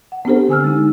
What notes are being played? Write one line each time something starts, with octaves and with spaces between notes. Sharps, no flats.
F#5
B3 C4 D4 G4 A4 C5
D3 G#5 E6 F6
G#3 D#4